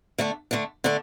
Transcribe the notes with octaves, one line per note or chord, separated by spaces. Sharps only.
D3 A3 D4
D3 A3 D4
D3 A3 D4